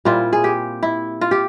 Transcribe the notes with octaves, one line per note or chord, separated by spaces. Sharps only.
A#2 G3 C4 E4 F4
G#4
G4
E4
F4
G4